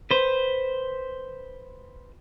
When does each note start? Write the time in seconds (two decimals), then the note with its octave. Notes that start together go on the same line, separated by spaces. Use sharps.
0.11 B4 C5